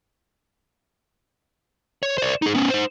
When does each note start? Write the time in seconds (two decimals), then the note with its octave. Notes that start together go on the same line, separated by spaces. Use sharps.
2.03 C#5
2.18 C5 D5
2.42 D#4 G#4
2.55 B3 C#4
2.70 D#4 C5